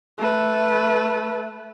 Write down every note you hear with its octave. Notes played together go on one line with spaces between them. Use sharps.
A3 B4